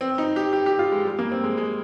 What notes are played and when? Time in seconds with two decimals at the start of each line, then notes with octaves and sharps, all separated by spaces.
0.01 C4
0.18 D#4
0.36 G4
0.53 G4
0.66 G4
0.79 F4
0.92 G#3
1.05 G3
1.19 A#3
1.32 C4
1.44 G#3
1.57 G#3